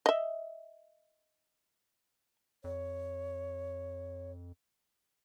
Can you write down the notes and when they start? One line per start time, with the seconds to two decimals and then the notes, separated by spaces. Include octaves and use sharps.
0.06 D#5 E5
2.64 F2 C#5